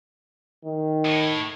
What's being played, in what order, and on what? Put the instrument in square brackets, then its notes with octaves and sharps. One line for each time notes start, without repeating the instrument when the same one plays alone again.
[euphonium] D#3
[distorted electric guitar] A2